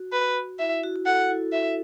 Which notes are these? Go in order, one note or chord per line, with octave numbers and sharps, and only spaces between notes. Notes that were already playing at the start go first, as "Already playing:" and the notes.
Already playing: F#4
B4
E4 E5
F#4
F#4
A4 F#5
E4
E5